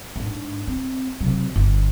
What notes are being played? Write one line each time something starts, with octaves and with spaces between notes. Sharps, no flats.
G#2 D4
C4
C3 F#3
G1